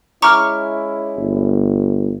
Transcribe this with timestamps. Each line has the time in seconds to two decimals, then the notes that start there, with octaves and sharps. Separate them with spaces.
0.22 G#3 C#4 E4 A#5 C#6 D6 F6
1.17 G1